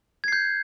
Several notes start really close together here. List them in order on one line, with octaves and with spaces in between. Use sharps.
G#6 C7 G6